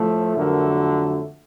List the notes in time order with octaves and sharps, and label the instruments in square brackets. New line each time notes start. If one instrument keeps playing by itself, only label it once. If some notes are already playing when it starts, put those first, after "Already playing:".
Already playing: [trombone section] A2 F3 A3
F2 D3 F#3 A3 A#4